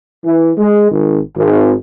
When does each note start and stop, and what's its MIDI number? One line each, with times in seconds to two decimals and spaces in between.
0.24 0.51 52
0.58 0.89 56
0.90 1.18 32
1.35 1.72 32